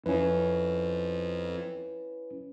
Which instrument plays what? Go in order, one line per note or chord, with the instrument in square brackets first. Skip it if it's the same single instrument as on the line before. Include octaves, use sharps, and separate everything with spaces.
[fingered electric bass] F2 [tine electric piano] C#4 E4 B4